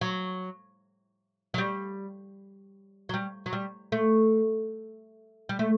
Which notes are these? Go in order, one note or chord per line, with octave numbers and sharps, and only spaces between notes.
F#3
F#3
G3
F#3
G3
F#3
G3
A3
G3
A3